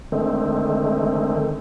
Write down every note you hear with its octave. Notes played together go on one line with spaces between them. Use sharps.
D3 D#3 G#3 A3 C4